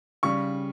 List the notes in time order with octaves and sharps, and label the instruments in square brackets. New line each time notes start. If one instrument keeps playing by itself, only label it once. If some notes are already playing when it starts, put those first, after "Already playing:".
[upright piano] C#3 G3 C#6